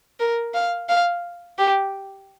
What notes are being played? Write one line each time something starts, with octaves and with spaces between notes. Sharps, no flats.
A#4
F5
F5
G4